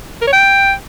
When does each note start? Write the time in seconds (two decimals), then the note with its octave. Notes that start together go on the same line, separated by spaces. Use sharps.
0.22 A#4
0.27 C#5
0.33 G5